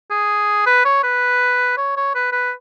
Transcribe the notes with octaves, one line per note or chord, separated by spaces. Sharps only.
G#4
B4
C#5
B4
C#5
C#5
B4
B4